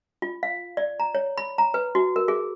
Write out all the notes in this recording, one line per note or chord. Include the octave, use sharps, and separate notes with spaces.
F4
F5
D5
A#5
C#5
B5
A#5
B4
F#4
A#4
G#4